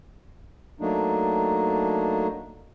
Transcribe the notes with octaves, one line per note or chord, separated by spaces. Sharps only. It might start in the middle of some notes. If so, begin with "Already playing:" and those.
F#3 A3 A#3 D4 D#4